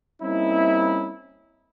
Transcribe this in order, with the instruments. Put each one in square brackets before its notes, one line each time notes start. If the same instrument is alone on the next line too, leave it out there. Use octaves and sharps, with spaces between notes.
[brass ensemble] G3 A#3 C4 C#4 D#4 E4